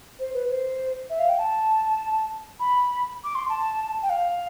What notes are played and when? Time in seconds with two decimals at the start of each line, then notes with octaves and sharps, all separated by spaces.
0.19 C5
0.34 B4
0.50 C5
1.10 E5
1.19 F5
1.29 G5
1.39 A5
2.60 B5
3.24 D6
3.35 C6
3.49 A5
4.03 G5
4.10 F5